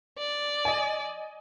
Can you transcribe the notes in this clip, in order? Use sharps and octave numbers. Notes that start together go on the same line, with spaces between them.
D5
D#5 G#5